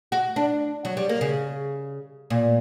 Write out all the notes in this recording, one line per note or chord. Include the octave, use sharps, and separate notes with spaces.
F#4
D4
F#3
G3
A#3
C#3
A#2